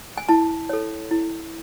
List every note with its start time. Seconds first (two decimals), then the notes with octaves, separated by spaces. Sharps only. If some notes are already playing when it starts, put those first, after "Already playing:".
0.18 G#5
0.29 E4 A5
0.69 A4 C#5
1.11 E4